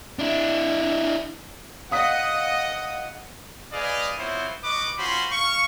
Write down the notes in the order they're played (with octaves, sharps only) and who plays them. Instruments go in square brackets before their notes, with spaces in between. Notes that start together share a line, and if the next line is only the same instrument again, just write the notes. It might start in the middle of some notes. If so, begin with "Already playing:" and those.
[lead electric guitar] D4 E4
[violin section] D#5 F#5 [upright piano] F5 D#6 B6
[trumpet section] G#4 B4 D5 D#5 F5 G#5
B3 C4 E4 F4 C5 C#5
B4 D#5 C#6 D6
C#4 F4 F#4 C5 B5 C6
F5 C#6